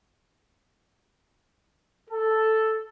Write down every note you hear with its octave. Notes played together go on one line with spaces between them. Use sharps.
A4